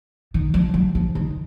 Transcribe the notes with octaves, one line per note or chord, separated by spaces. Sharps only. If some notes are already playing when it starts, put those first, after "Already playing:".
D#3
F3
F#3
F3
D#3